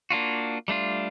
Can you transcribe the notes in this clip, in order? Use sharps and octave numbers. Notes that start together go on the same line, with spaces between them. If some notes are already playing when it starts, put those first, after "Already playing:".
A#3 D4 F4 F#4
G3 A3 D4 F4